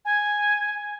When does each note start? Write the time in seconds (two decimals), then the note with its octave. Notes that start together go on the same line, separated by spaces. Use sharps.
0.05 G#5